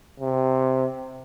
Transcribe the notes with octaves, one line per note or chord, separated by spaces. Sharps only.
C3